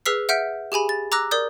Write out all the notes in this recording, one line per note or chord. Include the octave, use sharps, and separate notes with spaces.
G#4 B4 E6 F6 B6 C7
E5 F#5 F6 G6 B6 D7
G4 G#4 G#5 B5
A6
A#5 D6 E6 F#6 A#6
A#4 D5 D#6 G6